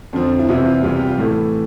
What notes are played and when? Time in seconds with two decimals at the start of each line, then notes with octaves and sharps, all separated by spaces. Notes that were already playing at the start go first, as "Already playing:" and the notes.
0.13 F2 D3 F3
0.39 E4
0.49 E2 C3 E3 F4
0.65 F4
0.83 E2 C3 G3 F4
0.96 G4
1.09 F4
1.18 A2 E3 A3